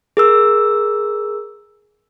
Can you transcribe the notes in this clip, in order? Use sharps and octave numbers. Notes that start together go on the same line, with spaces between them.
G#4 A#4 E6